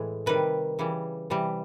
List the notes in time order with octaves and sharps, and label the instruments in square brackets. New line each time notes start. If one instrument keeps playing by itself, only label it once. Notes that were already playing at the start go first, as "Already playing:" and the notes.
Already playing: [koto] A2 E3 G#3
C3 D#3 G3 B4
C#3 E3 G3
C3 E3 G3